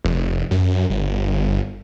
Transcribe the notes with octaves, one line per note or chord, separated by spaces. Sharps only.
F1
F#2
G1